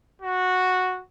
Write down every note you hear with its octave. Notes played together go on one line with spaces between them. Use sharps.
F#4